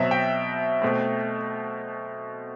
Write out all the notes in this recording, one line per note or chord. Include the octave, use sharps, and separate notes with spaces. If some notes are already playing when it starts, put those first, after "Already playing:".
Already playing: B2 F#3 C4 E5
G5
B2 A3 C4